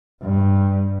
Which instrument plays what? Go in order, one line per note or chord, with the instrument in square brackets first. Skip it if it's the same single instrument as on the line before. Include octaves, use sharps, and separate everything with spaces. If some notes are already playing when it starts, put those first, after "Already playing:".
[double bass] G2